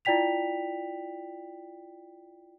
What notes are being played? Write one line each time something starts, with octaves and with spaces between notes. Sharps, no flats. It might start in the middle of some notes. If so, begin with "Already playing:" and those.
E4 F4 D5 G5 B6 F7